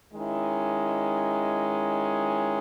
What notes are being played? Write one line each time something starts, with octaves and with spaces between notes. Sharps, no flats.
D#3 G#3 C#4 E4